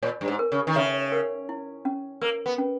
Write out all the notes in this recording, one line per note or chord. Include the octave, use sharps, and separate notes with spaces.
A#2 C#5
G2
G#2
A#4
C#3
D#3
C#3 E5
A#4
E4
C#4
A#3 A#4
B3
C#4